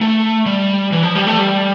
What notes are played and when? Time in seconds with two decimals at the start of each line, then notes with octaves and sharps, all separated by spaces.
0.01 A3
0.46 G3
0.92 E3
1.03 F3
1.15 G3
1.27 A3
1.38 G3